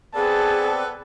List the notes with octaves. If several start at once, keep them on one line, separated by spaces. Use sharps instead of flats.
B3 C4 G#4 A4 B4 D5 A5